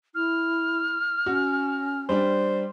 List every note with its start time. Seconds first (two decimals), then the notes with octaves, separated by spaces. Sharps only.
0.15 E4 F6
1.26 C#4 F#4
2.09 G3 D4 C5